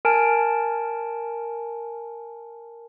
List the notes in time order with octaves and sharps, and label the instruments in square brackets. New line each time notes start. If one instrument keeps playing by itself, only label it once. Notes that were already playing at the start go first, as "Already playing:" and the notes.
[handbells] A#4 G#5 A5 F6 D7